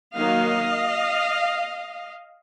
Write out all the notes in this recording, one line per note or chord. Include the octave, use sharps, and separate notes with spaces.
D#3 F#3 A#3 D#5 F5